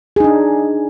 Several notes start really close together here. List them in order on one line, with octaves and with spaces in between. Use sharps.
G#4 D#4 D4